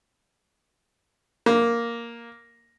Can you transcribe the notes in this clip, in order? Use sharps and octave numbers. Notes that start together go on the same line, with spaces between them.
A#3